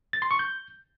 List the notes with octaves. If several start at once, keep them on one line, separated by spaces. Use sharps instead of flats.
A6
C6
C#6
G6